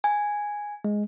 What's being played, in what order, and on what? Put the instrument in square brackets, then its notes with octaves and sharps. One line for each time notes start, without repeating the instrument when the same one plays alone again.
[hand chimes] G#5
[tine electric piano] G#3